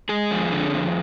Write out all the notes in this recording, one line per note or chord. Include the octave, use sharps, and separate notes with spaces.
G#3 G#4
F2
D3
F2